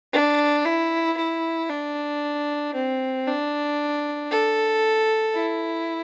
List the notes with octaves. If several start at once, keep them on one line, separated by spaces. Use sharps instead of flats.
D4
E4
E4
D4
C4
D4
A4
E4